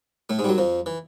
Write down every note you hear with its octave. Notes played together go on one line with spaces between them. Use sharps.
A2 A3
G#2 G#3
G3
F#2 F#3
F2 F3
E3